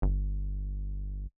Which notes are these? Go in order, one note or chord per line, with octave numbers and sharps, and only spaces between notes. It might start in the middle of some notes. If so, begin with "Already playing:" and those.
G1